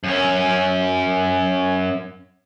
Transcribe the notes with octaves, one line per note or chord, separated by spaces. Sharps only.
F#2 C#4